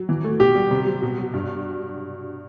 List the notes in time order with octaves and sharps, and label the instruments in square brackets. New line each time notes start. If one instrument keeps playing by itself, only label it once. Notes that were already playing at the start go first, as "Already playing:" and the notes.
Already playing: [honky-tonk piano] F#3
E3
A3
[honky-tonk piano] B2 [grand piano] G4
[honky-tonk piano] G3
C3
F#3
B2
F#3
G2